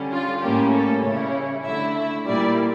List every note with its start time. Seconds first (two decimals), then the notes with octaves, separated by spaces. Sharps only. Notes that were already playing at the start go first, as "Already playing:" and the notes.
Already playing: D3 G3 C#4
0.12 F4
0.41 A2 G3 A#3 C#4 G4
0.72 A4
1.02 C#3 G3 C#4 E4 C#5
1.63 D3 A3 E4 E5
1.94 E5
2.25 A#2 G3 A#3 E4 D5